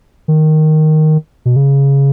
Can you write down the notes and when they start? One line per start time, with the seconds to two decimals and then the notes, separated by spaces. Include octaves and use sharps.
0.28 D#3
1.45 B2
1.56 C#3